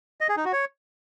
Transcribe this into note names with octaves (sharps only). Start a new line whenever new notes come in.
D#5
G#4
D#4
F#4
C#5